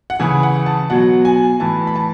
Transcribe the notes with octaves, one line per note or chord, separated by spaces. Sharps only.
F#5
C#3 E3 G#5
F#5
A5
B2 F#3 F#5
G#5
A2 E3 A5
B5
A5